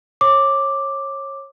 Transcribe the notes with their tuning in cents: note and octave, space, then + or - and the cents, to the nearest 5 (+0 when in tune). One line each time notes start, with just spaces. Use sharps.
C#5 -25 D6 +0